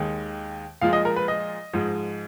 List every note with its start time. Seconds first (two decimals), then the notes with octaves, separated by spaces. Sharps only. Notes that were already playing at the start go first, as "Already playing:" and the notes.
Already playing: D#2 D#3 G#3
0.81 A#2 F3 G#3 F5
0.93 D#5
1.05 A#4
1.16 B4
1.28 D#5
1.73 G#2 F3 G#3